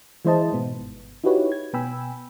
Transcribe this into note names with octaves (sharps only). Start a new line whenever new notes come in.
E3 G#3 E4 C5 D#5 A5
G#2 B2 B3
G1
D#4 E4 F#4 G4 B4 C#5
G#6
B2 B3 G5 G#5 B5 E6